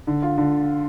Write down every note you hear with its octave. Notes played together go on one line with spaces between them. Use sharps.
D3
F4
D3